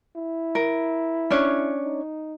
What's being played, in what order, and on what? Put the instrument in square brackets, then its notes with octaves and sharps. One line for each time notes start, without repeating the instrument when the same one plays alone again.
[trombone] E4
[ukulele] A#4
C#4 D4 C#5
[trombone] D#4